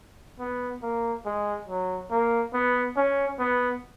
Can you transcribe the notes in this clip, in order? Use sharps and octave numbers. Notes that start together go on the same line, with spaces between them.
B3
A#3
G#3
F#3
A#3
B3
C#4
B3